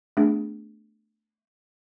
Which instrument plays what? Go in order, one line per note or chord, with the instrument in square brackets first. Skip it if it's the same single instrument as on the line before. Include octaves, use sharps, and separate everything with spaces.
[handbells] A3 B3 D4 G#4